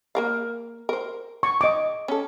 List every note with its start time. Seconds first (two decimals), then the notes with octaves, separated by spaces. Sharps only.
0.15 A#3 A#4 F5
0.89 A#4 C5
1.43 C#6
1.61 D#5 D6
2.08 C#4 A4